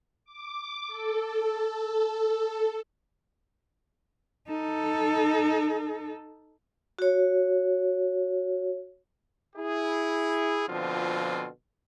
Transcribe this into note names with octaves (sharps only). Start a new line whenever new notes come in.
D6
A4
D#4 A4
F#4 C#5
E4 G#4
B2 D3 F3 C4 F4